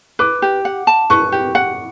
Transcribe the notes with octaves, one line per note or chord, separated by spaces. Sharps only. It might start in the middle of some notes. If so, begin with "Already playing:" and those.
B4 D6
G4
F#5
A5
B4 C#6
G4
F#5